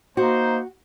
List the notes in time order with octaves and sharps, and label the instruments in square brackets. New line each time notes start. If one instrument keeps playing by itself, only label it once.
[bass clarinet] A#3 [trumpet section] D#4 C5 [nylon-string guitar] F#4